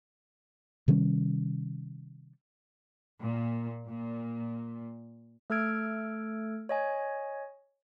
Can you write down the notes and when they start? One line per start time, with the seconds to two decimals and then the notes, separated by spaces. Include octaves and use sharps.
0.88 C3 D#3 G3 C#4
3.22 A#2
3.88 A#2
5.50 A3 A4 E6 F6 G#6 D7
6.69 C#5 D#5 G#5